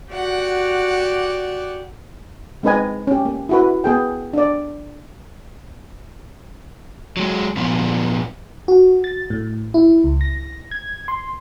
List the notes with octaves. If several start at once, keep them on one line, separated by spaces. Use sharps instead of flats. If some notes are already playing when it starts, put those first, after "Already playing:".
F#4 G4 D5 F#5
G#3 C4 D#4 B4 D#5 G#5
C#4 G4
A#3
E4 F#4 B4
B3 G#4 G5
D4 D5
F#3 G#3
A#2 F3 B3
F#4
A6
A2
E4
C#2
A#6
G#6
C6